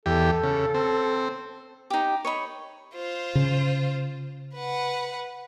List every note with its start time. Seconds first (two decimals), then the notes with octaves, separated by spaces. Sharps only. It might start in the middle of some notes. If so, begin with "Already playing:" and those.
0.06 E2 G4 A4
0.43 C#3
0.74 C4
1.90 D#4 G4
2.25 C#5 D#5 B5
2.94 F4 C5
3.35 C#3
4.55 B4 F#5